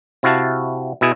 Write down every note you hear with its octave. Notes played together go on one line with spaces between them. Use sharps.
C3 E4 F#4 F5 A5
B2 E4 G#4